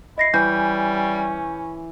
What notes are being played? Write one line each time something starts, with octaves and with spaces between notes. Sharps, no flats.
E4 D#5 A#6 C7
E3 G3 C#4 G6